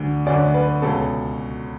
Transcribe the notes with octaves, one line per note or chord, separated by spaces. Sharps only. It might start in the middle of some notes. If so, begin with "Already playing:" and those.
Already playing: D2 D3
D2 D3 D5
B4
C#2 B2 A4